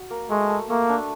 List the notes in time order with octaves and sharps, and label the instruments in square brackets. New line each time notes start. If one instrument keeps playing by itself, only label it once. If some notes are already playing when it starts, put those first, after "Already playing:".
Already playing: [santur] F#4
A#3
[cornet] G#3 [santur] A3
[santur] A3
[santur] A3 [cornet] A#3
[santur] D4